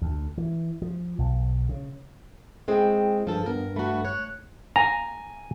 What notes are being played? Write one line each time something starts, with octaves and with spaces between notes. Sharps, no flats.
D2
E3
F3
B1
C#3
G#3 C4 E4 G#4 G5
G2 F3 A4
G2 B3 A#4
A3 F#4 B5
C#5 F#6
G#5 A#5